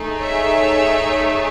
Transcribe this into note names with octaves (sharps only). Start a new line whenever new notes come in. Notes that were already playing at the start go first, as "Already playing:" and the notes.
Already playing: A3 D#4 G#4
C#5 E5